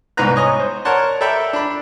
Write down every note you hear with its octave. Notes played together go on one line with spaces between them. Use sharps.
C2 G#2 B3 B4 A#5 F#6
C#5 D#5 G#5 A#5
C5
A#4 C#5 D5 F#5 A5 C6
A4 A#4 D5 E5 G5 B5
D4 B5